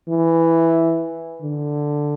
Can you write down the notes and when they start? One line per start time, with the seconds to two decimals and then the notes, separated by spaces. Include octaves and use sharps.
0.09 E3
1.42 D3